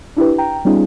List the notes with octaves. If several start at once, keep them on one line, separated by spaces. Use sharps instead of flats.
D4 E4 G4 B4
G5 A#5
G3 B3 C#4 D#4 F4 G#4